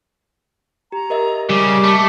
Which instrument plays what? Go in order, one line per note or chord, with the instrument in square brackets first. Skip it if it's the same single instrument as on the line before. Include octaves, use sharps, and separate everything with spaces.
[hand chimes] G4 [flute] A#5
[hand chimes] A#4 D#5 E5
[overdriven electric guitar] C#3 [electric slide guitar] G3 [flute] D6
[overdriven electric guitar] A3